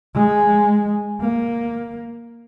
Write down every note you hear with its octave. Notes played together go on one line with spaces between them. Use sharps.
G#3
A#3